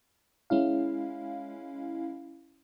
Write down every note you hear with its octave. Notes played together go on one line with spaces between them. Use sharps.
G#3 C#4 E4 F5